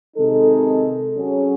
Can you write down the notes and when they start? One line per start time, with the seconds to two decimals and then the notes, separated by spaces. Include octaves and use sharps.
0.16 C3 D#3 G#3 D#4 A4
1.15 F#3 C#4 G#4